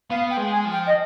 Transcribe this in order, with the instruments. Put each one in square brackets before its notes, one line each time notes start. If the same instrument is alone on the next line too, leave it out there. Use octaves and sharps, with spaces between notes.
[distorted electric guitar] B3 [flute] F5
[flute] G5
[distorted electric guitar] G#3
[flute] G#5
[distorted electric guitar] F3
[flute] G5
D#5